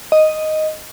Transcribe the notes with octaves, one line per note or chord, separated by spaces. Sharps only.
D#5